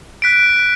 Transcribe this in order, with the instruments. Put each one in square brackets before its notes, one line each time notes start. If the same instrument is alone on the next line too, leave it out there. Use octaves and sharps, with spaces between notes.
[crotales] F#6 B6 D7